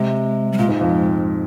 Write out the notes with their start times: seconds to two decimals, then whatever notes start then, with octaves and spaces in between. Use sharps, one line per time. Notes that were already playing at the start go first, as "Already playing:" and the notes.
Already playing: C3 G#3
0.52 G3
0.58 A#2 G#3
0.69 G#2
0.81 F2